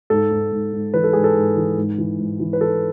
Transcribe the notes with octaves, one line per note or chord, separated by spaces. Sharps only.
G#2 A4
G#2
G#2
G#2
E3 B4
A4
G#2 G#4
A4
G#2
E3
G#2
E3
G#2
E3
B4
E3 A4